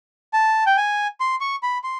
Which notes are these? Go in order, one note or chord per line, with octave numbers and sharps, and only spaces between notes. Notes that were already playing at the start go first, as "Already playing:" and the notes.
A5
G5
G#5
C6
C#6
B5
C6